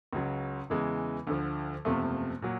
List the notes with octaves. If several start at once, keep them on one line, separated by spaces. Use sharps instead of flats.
C#2 C#3 F#3
E2 C#3 E3 G#3
D2 D3 F3
F#1 E2 C3 F3 A3
A#2 F#3